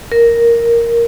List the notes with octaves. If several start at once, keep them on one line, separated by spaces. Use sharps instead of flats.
A#4